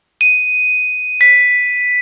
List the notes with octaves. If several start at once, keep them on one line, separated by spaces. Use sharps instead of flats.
D#7
B6